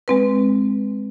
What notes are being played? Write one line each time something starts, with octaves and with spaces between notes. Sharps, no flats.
G#3 C4 B4